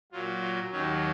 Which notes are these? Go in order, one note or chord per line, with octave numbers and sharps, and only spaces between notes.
A#2 F#3 F4
F4
D#2 D#3 F#3 C#4